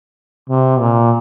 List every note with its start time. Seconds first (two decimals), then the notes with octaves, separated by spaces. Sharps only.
0.49 C3
0.79 A#2